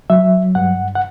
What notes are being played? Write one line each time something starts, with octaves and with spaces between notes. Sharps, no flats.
F#3 E5
G2 F#5
F#5